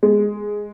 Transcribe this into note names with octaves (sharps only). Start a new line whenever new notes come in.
G#3